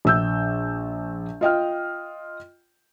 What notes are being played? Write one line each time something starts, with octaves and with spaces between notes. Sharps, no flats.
A#1 E6 G6
F4 D#5 G5 F6